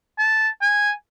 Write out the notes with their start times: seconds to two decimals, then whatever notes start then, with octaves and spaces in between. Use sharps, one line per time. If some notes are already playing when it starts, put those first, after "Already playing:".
0.19 A5
0.62 G#5